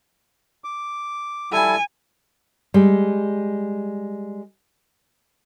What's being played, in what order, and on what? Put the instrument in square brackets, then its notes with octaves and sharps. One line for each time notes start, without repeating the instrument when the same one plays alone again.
[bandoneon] D6
[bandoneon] G3 E4 A4 [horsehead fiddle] G#5
[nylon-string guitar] G3 G#3